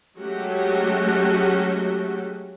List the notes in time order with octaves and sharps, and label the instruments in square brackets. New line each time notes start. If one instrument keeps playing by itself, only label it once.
[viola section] F#3 G#3 A3 C#4 F#4 G4